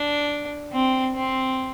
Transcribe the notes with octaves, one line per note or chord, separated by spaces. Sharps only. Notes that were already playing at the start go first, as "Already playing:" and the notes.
Already playing: D4
C4
C4